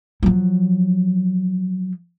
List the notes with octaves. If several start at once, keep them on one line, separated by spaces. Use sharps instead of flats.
F3 F#3